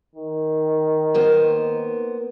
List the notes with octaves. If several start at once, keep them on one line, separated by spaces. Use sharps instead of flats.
D#3
A#3 B3 C5